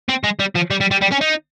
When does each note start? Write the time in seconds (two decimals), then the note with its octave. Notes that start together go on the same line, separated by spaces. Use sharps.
0.09 C4
0.24 G#3
0.39 G3
0.55 F3
0.70 G3
0.81 G3
0.91 G3
1.02 G3
1.12 C#4
1.21 D#4